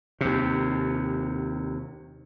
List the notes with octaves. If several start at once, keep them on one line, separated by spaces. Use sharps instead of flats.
D#2 C3